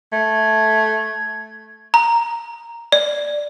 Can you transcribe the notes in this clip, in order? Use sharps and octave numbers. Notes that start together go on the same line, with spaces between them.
A3 G#6
A#5
D5